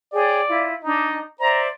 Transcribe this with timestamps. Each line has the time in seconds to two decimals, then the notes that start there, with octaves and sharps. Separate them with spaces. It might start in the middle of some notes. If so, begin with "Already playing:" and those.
0.12 G#4 C#5 D5 G5
0.48 E4 F4
0.84 D4 D#4 D#5
1.39 C5 D5 E5 A#5